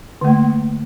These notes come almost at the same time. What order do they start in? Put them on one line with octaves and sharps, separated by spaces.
D3 A3 A#3